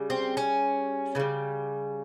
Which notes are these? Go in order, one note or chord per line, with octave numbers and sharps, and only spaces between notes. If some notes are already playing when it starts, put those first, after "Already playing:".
Already playing: C#3 G3
C4
C#4
C#3 E3 G3